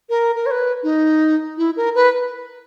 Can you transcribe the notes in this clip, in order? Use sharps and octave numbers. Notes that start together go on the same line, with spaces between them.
A#4
A#4
C#5
B4
D#4
E4
A#4
B4